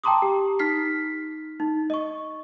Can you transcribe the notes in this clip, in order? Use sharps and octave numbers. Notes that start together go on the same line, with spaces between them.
G5 A5 A#5 C6 D6 D#6
G4
D#4 F6 B6 C7
D#4
D#5 C#6